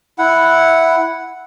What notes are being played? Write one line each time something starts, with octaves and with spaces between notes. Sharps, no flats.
E4 F#5